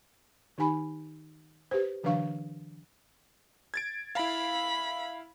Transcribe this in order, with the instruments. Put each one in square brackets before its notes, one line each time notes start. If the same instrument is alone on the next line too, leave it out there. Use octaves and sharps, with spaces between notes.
[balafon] D#3 D#4 G4 G#5 B5
G4 B4 C5
D3 E3 F#3 D4 F5 C#6
[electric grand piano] G#6 A6 D7
[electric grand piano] E4 F5 [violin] B5